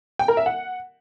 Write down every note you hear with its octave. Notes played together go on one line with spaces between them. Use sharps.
G5
A#4
E5
F#5